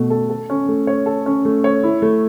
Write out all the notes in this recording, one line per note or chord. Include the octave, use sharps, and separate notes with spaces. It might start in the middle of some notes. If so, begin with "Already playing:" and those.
Already playing: B2 A3
A4
A4
C#4
A3
C#5
A4
C#4
A3
C#5
E4
A3